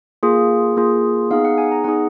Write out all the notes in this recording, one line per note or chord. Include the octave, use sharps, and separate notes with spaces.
A#3 F4 G#4
A#3 F4 G#4
B3 D#4 G#4 F5
F#5
G#5
A#5
B3 D#4 G#4 F#5